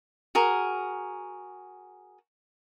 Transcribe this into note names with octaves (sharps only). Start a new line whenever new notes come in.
F#4 G#4 A#4